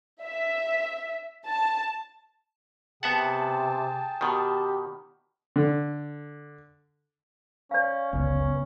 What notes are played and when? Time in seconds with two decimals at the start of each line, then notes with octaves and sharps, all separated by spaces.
0.23 E5
1.47 A5
3.03 C3 B3 G#4 E5 F#5 G5 A5
4.21 B2 D#3 G4
5.56 D3
7.71 C#4 D5 F5
8.13 G1 C#2 F#2 C#3 B3 C#4